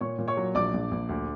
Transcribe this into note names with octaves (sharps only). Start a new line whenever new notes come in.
A#2 C#5 C#6
A#2
C#5 C#6
F#3
A#1 D5 D6
A#1
A#1
D2